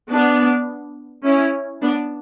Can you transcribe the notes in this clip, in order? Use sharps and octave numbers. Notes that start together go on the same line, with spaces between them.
B3 D4
C#4 E4
B3 D4